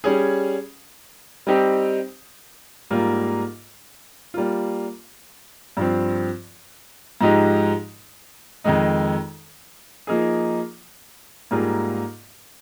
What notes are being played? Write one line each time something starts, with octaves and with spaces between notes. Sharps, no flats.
G3 C#4 G#4
G3 C4 D#4 G4
G#2 G3 A#3 F4
G3 A#3 F4
G2 F3 C4
G#2 F3 G#3 D#4 G4
F2 D#3 G#3 D#4
F3 A#3 D#4 G#4
G#2 G3 A#3 F4 G#4